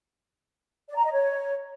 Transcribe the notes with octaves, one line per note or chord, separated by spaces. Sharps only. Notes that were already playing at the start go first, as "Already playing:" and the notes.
D5
A#5
D#5
C#5